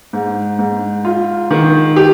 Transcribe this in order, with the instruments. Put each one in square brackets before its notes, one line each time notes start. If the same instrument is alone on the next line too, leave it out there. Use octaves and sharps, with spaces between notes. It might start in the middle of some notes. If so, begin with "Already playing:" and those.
[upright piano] G#2
G#2
F4
D#3
G4